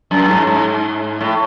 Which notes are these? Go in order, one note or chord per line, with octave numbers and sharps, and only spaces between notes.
F#2
G#2
G#2
A2